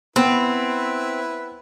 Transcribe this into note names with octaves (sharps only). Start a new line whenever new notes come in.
B3 C4 E4 B4